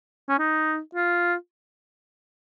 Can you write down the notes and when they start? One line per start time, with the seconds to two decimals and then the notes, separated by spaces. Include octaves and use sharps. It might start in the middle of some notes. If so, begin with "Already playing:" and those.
0.29 C#4
0.39 D#4
0.95 F4